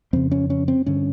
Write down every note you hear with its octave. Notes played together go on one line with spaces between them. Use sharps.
F2 C#3 C4
C#4
C#4
C4
G2 D3 C#4